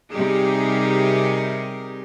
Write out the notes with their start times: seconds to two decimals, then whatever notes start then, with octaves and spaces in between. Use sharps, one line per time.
0.12 C3 G3 D#4 G4 G#4 A#4